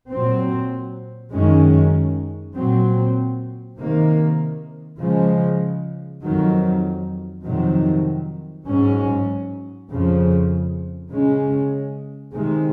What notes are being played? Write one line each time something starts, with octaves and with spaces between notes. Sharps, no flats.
A#2 F#3 C4
F#2 D#3 G#3 C#4
A#2 F#3 C4
C3 D#3 A#3
C#3 F3 G#3
F2 D#3 F#3
F2 C3 D#3 F#3
G#2 F#3 C#4
F2 C#3 F3
C#3 G#3 C#4
C3 D#3 G#3